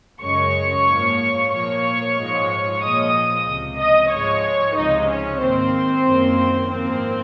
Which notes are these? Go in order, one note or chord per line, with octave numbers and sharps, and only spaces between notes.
F#2 C#3 G#3 C#5 C#6
G#2 F3 A#3
A#2 F3 A#3 C#5 C#6
G#2 F3 G#3
A#2 F3 G#3 D#5 D#6
C#2 C3 F3
D#5 D#6
G#2 F3 G#3 C#5 C#6
C#2 C3 F3 G#3 D#4 D#5
C#4 C#5
G#2 D#3 A#3 C4 C5
F#2 D#3 A#3
G#2 F3 A#3 C4 C5